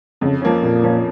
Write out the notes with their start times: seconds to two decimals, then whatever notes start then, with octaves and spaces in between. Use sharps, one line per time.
0.21 F2 C#3
0.42 F3 A#3 C#4
0.63 F2 A#2
0.83 F3 A#3 C#4